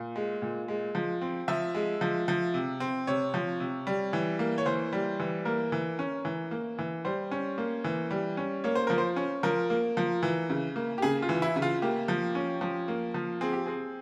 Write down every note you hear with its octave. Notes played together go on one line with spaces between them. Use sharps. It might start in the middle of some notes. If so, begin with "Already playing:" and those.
Already playing: A#2
G#3
A#2
G#3
F3
C4
F3 E5
G#3
F3
F3
C3
C4
C3 C#5
F3
C3
G3
E3
A#3
C#5
E3 C5
G3
E3
A#3 A#4
E3
C#4
E3
A#3
E3
G3 C5
C#4
A#3
E3
G3
C#4
A#3 C#5
C5
F3 A#4
C5
C#4
F3 A#4
A#3
F3
E3
C#3
A#3
G4
C#3 G#4
F4
E3
E4
C#3
F4
A#3 G4
F3
C#4
F3
A#3
F3
C4 G#4
G4
C4 G#4